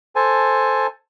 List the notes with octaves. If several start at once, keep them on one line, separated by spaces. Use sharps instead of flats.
A4 C5 G#5 A5